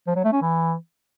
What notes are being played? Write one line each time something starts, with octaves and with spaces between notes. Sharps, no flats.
F3
F#3
A3
C#4
E3